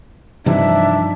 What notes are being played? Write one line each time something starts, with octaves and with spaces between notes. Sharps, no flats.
G2 C3 E3 F3 D4 D#4 E5